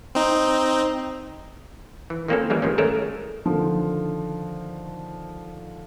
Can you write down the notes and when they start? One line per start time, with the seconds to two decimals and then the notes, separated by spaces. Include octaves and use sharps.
0.15 C4 D#4
2.10 E3
2.28 D#3 F3 A#3 C4 C#4 A4
2.50 E3 G3 G#3 A#3
2.62 G#2 D#3 F3 C#4
2.78 G#3 A3 C#4 A4 A#4
3.46 D3 D#3 F3